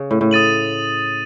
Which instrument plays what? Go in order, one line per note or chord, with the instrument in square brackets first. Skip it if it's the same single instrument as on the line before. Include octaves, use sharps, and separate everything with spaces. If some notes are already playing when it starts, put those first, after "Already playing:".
Already playing: [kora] C#3
A2
A2
[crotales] D#6 A6 D#7 F#7